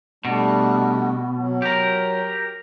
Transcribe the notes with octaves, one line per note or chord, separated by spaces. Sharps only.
B2 G3 A3 D4
F#3
G4 A#4